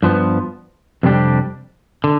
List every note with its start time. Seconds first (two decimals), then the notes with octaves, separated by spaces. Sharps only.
0.03 G2 F3 B3
1.03 F2 C3 G3 D4 G4
2.04 D3